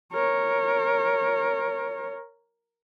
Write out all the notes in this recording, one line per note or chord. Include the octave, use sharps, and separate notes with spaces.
A#4 C#5